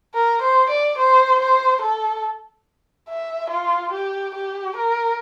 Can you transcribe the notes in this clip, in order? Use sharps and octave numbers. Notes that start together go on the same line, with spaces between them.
A#4
C5
D5
C5
C5
A4
E5
F4
G4
G4
A#4